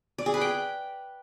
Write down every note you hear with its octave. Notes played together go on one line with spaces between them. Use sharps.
D5
G#4
B4
G5